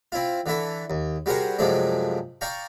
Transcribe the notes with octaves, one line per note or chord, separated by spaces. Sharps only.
C4 E4 F4
D3 E3 E4 A4
D#2
G3 F#4 G#4 A#4 C5 F#5
F#2 C3 F3 G#3 A3 D4
D5 F5 G5 A#5 C#6